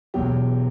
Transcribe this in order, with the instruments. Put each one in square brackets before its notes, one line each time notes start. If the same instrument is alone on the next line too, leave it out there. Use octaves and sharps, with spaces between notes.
[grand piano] E1 E2 B2 F#3 G4